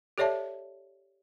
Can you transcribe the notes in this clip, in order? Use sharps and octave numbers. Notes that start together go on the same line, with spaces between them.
G4 A4 C#5 D5 E5 A5